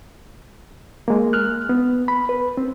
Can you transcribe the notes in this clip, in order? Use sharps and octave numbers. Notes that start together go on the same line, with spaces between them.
G#3 A#3
F6 F#6
B3
B5
B4
C4